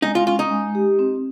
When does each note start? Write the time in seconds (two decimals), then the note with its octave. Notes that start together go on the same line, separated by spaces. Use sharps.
0.02 G#3 D#4
0.15 F4
0.26 C#4 F4
0.39 D#4
0.50 G#3
0.75 G4
0.99 C4